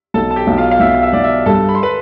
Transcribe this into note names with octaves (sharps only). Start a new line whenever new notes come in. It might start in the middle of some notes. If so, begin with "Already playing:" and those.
B1 A4 A5
A5
G4 G5
B1
F4 F5
F5
B1 E5
E5
B1 D5
E5
G2 A4 A5
B5
C6
B4 B5